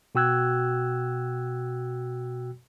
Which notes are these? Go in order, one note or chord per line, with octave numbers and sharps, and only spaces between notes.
B2 F#4 G5 E6 F#6 G#6